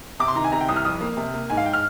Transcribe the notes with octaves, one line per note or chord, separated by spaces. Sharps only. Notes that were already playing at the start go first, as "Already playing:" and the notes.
C3 D6
C6
D#3 A#5
G#5
C3 A#5
G5
C2 D#6
F6
F2 D#6
A#3
C3
A#3
G#2 G#5
F5
G5
F6